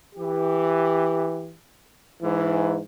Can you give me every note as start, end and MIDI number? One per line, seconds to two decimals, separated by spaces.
0.15 1.53 52
0.15 1.53 67
2.22 2.80 44
2.22 2.80 52